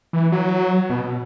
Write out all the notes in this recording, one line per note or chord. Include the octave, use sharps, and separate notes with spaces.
E3
F#3
B2